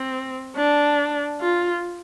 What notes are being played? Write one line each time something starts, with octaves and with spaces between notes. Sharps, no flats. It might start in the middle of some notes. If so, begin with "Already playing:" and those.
Already playing: C4
D4
F4